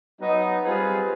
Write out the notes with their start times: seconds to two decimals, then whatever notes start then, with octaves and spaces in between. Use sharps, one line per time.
0.20 F#3 B3 D#4
0.64 G3 C4 F4 G#4 B4